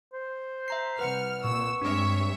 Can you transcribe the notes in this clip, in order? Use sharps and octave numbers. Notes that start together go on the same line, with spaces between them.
C5
E5 A#5 C7
C2 B4 F#5 F6 C#7
A#2 C#6 E6
G2 G#3 C4 D4 C#5 E5